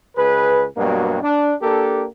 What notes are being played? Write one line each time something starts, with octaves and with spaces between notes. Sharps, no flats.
C#2 G#4 B4
G2 B2 F#3 G3 A#3
D4
A#3 D4 G4 A4